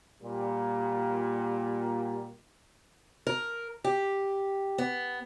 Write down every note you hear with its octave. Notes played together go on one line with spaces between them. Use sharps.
A#2 G3
A#4
G4
B3